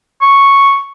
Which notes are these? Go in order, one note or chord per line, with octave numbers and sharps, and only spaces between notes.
C#6